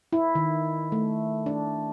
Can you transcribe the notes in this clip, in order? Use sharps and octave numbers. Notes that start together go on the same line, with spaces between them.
E4
D#3
A3
D4